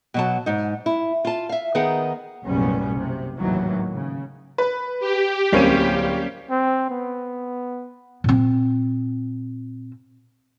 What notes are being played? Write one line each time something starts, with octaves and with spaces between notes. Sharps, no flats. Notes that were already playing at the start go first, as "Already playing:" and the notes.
B2 F#3 A5
G#2 D#4
E4
F4 A5
E5 F5
D#3 B3 D#4 G#4 F#5
F#1 B1 A2 G3 B3 C#4
F#1 C3
G#1 D#2 A2 D#3 E3 F#3
C#3
B4
G4
D1 G3 A#3 C4 C#4 D#7
C4
B3
A#2 C4